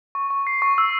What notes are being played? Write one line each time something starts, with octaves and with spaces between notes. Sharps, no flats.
C#6
C#6
C7
C#6
E6